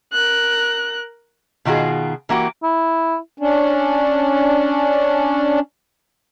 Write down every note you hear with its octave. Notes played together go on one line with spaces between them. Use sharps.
A#4 F#6
B2 D#3 F4 F#4 G#4
E3 A#3 F#4 G4
E4
C#4 D4